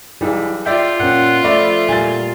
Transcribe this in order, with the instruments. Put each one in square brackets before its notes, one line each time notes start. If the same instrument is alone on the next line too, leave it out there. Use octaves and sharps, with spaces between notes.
[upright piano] B1 E3 G3 [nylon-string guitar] G#4
[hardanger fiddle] F4 [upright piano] D5 E5 [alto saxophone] G5
[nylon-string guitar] A#2 C#4 [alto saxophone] F#5
[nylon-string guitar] F3 [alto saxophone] A3 [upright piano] D5 E5 B5
[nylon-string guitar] A#2 G3 [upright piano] G#5 A6